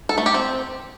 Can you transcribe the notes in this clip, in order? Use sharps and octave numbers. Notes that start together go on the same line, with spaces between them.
A4
A3
G4
C4